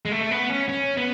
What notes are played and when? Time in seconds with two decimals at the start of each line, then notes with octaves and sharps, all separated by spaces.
0.05 G#3
0.12 A3
0.31 B3
0.50 C#4
0.69 C#4
0.97 B3